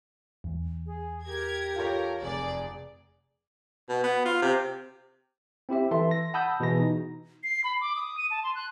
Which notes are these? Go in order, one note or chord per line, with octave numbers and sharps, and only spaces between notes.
E2
G#4
G4 A#4 G#6
F4 A4 A#4 C#5
F1 G#4 D5
B2
B3
F4
C3
C4 E4 G4 E5
E3 A4 E5 C6
A#6
F#5 A5 B5 D#6 E6 G6
B2 E3 G#4 A#6
D#4
C7
B5
D6
D#6
D#7
A5
C6
F#6